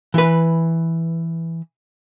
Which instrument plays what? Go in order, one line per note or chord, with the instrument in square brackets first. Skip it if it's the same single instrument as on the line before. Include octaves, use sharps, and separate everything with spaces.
[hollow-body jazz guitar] E3 B4